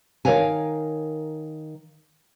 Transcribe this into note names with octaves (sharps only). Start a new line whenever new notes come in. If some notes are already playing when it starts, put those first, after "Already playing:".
D#3 A#4 C5 C#5 F5 G#5